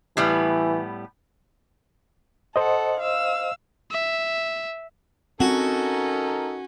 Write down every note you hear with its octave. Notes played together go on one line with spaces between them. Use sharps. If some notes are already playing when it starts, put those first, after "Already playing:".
A2 E3 G3 B3
A4 C5 D#5 F#5
F5 E6
E5
C4 C#4 D#4 F#4 A4 A#4